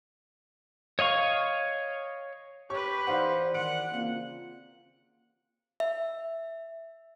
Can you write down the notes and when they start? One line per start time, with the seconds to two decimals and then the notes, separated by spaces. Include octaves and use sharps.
0.99 C#5 D#5 F5 C#6
2.70 G4 B4 C#5 C#6
3.07 E3 D#4 C5 D5 F5 F#5
3.54 D#3 F#5 D7
3.91 C#3 A#3 C4 F4
5.80 E5